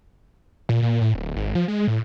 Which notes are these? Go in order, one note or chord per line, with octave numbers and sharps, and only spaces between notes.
A#2
A#2
A2
D1
G#1
F3
G#3
A2